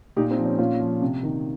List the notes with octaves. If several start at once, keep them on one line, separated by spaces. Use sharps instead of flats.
A#2 D#4 G4
C4 D#4
F3
C#4
A#2 C#4 F4
F3
C3
D#3